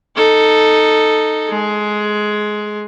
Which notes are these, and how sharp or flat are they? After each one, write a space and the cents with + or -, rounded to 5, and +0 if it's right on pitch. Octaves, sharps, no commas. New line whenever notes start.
D#4 -5 A4 +0
G#3 +15 G#4 +15